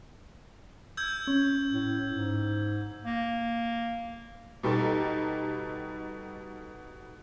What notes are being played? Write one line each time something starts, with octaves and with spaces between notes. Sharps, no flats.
E6 G6 G#6
C#4
A2
G#2
A#3
B2 G3 D#4 G4 A4